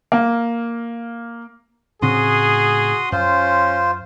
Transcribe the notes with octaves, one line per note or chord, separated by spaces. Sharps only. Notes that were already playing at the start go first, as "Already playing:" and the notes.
A#3
A2 C#3 C4 F#4 G#4 C6 D#6
F#2 C#4 F4 C5